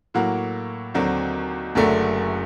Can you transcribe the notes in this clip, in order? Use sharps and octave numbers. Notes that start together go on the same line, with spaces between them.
A2 F#3 A#3 F#4
D#2 D3 F#3 C4
F#1 F#2 D3 F#3 A3